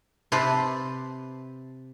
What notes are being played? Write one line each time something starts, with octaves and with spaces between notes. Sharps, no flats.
C3 B4 C5 A5